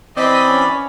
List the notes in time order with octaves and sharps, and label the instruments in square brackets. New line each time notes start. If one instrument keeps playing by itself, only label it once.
[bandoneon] E3 D5 [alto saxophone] C4 [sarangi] D#5 [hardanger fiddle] B5
[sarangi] C#4